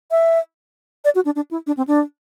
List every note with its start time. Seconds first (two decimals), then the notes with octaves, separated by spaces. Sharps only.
0.11 E5
1.05 D5
1.15 F#4
1.25 D4
1.36 D4
1.51 E4
1.67 D4
1.77 C4
1.87 D4